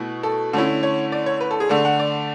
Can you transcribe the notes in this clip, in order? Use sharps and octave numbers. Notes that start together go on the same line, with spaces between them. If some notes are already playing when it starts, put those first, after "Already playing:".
Already playing: B2 A3 E4
A4
D3 A3 C#4 E4
C#5
D5
C#5
B4
A4
G#4
D3 A3 D4 A4
F#5
D5